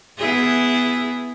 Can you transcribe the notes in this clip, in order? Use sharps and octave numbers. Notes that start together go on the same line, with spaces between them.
B3 E4 G#4